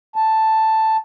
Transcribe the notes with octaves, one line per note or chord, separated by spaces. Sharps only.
A5